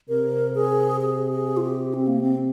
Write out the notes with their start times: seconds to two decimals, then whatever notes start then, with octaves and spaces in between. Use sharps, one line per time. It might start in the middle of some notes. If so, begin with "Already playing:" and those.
0.08 C3 A#4
0.55 G#4
1.01 G#4
1.32 G#4
1.57 F4
1.62 G4
1.94 C4
2.07 A#3
2.21 C4